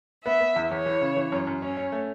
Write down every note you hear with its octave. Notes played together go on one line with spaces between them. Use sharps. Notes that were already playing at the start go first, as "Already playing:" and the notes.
B3 E5
B3
E2
E2 C#5
E3
C#3
E3
F#2
F#2
C#4 C#5
C#4
A3